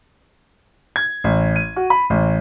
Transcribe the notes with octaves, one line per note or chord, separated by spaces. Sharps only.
G#6
A1
D#7
F#4
B5
A1